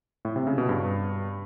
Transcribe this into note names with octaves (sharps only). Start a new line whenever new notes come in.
A2
C3
C#3
B2
G2